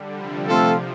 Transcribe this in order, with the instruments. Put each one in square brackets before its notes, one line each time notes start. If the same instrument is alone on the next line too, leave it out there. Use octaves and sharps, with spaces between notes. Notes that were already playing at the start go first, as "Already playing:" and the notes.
Already playing: [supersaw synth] D3 G3
C3 F3
[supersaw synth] C3 F3 [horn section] A3 C4 F4 A4